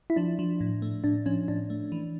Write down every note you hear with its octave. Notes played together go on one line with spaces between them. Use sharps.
E4
F3 D4
F3
A2
A3
A2 D4
F3 C#4
A2 D4
A3
E3